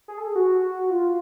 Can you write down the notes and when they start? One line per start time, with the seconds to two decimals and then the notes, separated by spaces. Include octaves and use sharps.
0.08 G#4
0.18 A4
0.27 G#4
0.35 F#4
0.90 F4